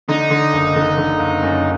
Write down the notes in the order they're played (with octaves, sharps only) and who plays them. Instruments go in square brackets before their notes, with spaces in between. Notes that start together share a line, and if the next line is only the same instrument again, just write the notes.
[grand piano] D3 [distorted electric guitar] D#4
[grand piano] D3
F#1
D3
D3
F#1
F#2